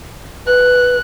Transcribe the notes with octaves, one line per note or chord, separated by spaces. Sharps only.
B4 F#6